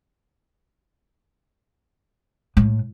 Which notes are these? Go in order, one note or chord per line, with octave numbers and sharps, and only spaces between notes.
A2